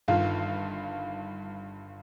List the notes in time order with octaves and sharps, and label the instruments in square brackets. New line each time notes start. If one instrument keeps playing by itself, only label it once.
[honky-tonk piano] G1 G2 D#3 [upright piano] F4